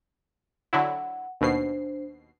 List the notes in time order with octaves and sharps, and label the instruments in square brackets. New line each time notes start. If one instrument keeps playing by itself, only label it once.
[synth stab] D3 F#3 E4 [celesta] F#5
[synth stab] D#2 B2 C7 [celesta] D4 C5